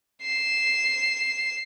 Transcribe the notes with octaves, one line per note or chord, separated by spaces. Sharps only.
C7 E7